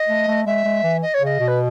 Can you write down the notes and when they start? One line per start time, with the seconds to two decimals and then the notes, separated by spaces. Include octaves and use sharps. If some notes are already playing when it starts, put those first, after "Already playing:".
Already playing: D#5
0.09 A3
0.28 A3
0.46 G#3 E5
0.65 G#3
0.83 E3
1.02 D#5
1.14 C#5
1.21 C#3 D#5
1.40 B2
1.47 B4